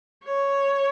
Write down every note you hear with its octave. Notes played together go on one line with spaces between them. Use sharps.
C#5